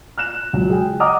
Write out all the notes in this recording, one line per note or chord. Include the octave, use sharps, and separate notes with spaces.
F6 F#6 E7
C#2 F#3
G#4 G5
D#5 F#5 A#5 D6 D#6 F6